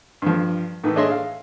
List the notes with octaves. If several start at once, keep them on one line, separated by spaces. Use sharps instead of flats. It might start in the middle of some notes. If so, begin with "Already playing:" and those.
G2 F3
A2 D#3 E3 A3
D4 G#4 C#5 D#5 E5 C6
F5